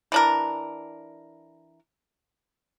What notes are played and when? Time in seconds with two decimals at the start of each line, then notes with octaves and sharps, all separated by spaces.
0.12 E3 D4 A#4